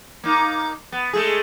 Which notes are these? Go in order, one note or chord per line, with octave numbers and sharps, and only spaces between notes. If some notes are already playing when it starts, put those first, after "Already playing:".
A#3 D#4
B3
G#3 A3 G#4